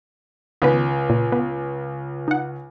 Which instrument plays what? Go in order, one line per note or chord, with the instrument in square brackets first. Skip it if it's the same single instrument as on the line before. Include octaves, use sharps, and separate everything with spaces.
[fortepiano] C#2 [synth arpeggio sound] D#3 B3 B4
[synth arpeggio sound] A#2
B3
D#4 F#5